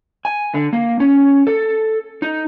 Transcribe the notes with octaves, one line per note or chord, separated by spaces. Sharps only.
G#5
D3
A#3
C#4
A4
D#4